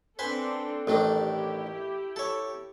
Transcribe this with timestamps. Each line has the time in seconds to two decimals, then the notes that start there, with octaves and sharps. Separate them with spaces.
0.19 C4 D4 A4 B4 C5 G#5
0.87 A1 D#3 D4 E4 G4 A4 C#5
2.16 A4 C#5